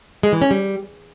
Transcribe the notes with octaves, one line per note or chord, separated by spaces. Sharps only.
G#3
E3
C#4
G3